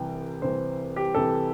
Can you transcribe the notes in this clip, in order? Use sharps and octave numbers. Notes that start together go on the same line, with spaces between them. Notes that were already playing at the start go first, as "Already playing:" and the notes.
Already playing: C2 C3 E3 G5
C2 C3 E3 C5
G4
C2 C3 E3 A4